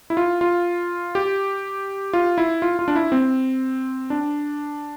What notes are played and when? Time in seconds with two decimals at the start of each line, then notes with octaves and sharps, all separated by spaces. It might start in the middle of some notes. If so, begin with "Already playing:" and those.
0.10 E4
0.17 F4
0.41 F4
1.15 G4
2.13 F4
2.38 E4
2.62 F4
2.79 F4
2.88 D4
2.95 E4
3.12 C4
4.10 D4